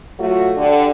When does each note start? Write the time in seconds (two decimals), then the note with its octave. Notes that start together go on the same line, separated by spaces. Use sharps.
0.19 F#3 A3 F4 F#4
0.57 D3 G4